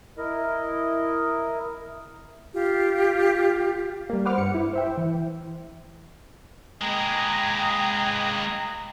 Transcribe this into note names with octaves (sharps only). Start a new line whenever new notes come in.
E4 A#4 D#5
F4 G4
G3 A#3
B4 C5 F#5 D6 F6
G2 C#7
E4
C5 E5 G5
E3
G#3 A#3 G#4 B4 D#5 G5 A#5